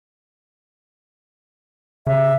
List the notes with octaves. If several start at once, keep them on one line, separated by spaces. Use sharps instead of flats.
C#3 E5